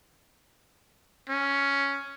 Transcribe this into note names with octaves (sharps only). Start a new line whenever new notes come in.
C#4